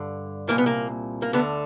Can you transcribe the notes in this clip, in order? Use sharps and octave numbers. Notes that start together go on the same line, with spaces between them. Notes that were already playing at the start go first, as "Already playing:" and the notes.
Already playing: G2 D3
C2 A#2 A#3
B3
A#3
A#3
D2 D3 B3